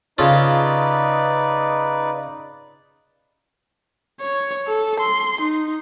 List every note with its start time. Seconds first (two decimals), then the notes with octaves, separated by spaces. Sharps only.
0.18 C#3 D#4 F4 A4 B4 D5
4.21 C#5
4.67 A4
5.00 C6
5.41 D#4